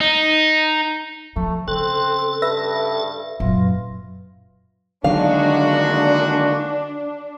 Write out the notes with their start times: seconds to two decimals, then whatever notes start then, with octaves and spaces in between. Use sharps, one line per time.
0.01 D#4
1.36 F3 A3
1.68 C#3 C4 A4 F#6
2.42 G2 B4 E5 A#6
3.40 F#2 A#2 F4
5.04 D3 D#3 F#3 G#3 A#3 D4 F#4 F5